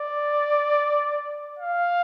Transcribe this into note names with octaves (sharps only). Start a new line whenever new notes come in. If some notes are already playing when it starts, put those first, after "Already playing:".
Already playing: D5
F5